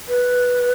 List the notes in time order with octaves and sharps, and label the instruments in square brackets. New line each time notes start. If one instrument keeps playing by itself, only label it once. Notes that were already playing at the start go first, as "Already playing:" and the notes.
[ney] B4